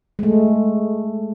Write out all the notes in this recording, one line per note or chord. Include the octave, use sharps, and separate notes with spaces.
G#3 A3